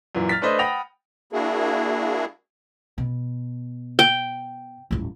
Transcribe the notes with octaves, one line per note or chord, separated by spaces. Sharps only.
F#2 A#2 E3
F6 A6 B6
A3 D4 B4 C5 D#5
F#5 G5 B5 D#6 A#6 F7
A#3 D4 E4 F#4 G#4
B2
G5
D#1 A1